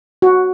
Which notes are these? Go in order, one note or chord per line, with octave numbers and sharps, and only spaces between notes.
F#4